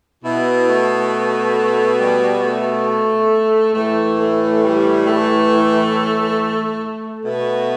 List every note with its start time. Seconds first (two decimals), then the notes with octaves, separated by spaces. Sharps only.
0.23 B2 E4
0.68 A3
1.99 G3
2.43 A3
3.74 A2 E3 A3
4.18 A3
4.62 G3
5.06 A3
7.25 B2 A3